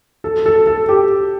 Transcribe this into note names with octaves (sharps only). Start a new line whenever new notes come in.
A4
A4
A4
G4